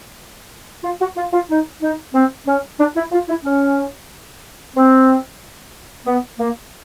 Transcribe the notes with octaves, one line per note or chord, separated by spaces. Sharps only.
F4
F#4
F4
F4
D#4
D#4
C4
C#4
D4
E4
F4
E4
C#4
C4
B3
A#3